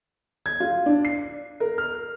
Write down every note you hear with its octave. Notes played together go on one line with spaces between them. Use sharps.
G#6
F4
D4
C7
A#4
F6